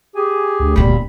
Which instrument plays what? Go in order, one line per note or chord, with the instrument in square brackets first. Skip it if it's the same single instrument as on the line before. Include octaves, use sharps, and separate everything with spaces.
[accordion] G4 G#4 G#5
[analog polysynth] D2
[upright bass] E1 A#2 [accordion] G3 B5